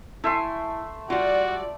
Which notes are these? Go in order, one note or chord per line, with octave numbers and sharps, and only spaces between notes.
A3 E4 E5 G#5 C6
G3 F4 F#4 D5